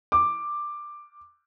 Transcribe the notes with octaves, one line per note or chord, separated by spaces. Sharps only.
D6